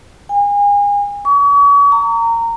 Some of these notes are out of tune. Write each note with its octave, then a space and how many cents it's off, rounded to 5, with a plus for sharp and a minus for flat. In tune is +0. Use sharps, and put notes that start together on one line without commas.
G#5 -35
C#6 +40
A#5 -20